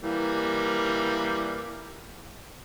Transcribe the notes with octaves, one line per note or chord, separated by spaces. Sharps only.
E3 G3 A#3